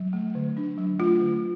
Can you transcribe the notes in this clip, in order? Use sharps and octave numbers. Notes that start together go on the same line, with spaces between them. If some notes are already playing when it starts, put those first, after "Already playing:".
Already playing: F#3
A3
D3
D4
F#3
A3 F4
D3